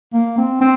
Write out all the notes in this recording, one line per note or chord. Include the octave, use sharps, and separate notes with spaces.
A#3
C4
C4